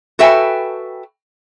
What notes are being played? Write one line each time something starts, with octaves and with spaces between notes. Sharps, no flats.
F#4 A4 B4 E5 G5 G#5